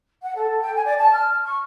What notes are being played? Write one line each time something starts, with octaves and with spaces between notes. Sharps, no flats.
F#5
A4
G5
G#5
D5
A5
F6
C#6